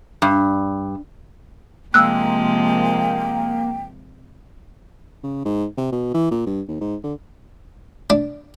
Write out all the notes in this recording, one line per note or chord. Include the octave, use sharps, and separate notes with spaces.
G2
C3 F3 G#3 A#3 G5 E6 F#6
C#3
G#2
C3
B2
E3
A#2
G2
D#2
G#2
D3
D4